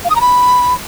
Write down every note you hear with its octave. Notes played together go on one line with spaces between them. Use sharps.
F5
D#6
A#5
B5